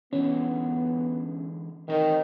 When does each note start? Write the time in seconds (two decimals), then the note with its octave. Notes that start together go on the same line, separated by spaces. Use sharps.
0.13 D3 E3 G#3 B3 C#4
1.89 A2 C3 D#3 E3 C4 A#4